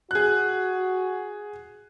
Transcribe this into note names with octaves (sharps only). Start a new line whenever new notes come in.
F#4 G#4 F#6